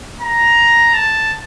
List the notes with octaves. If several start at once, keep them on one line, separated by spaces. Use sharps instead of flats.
A#5
A5